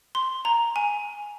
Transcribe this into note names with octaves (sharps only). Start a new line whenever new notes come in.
C6
A#5
G#5